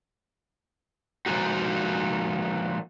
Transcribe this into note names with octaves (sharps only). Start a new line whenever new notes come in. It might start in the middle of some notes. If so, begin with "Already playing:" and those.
F3 G#3 A#3 D#4 F#4